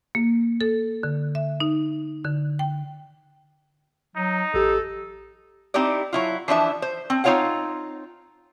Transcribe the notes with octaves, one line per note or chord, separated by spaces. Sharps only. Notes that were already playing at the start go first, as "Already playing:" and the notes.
A#3
A4
D3
E5
D#4
D3
G5
F#3 D#4
A1 G4 A4
C4 D#4 E4 G4 D5
F#3 E4 F4
E3 F3 D4 E5
C5
C4
C4 D#4 F4 C#5 F5 F#5